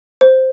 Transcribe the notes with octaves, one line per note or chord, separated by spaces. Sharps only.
C5